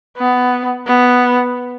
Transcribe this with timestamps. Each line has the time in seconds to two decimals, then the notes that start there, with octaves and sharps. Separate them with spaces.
0.18 B3
0.87 B3